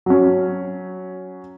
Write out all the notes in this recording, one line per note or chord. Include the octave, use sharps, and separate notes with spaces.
F#3 C#4